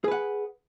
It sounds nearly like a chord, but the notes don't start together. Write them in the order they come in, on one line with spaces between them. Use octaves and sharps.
G#4 B4 F#5